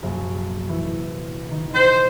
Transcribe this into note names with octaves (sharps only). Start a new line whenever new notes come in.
A#1 F#2 C3
E3 E4
D#3
C5